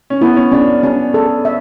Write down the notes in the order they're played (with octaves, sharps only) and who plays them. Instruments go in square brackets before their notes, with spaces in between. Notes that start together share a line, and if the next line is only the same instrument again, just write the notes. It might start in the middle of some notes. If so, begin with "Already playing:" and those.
[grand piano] C#4
[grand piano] B3 [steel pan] E4
[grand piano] C#4
[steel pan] C#4 [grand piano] D4
[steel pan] C#4 [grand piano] D4
[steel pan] A4
E5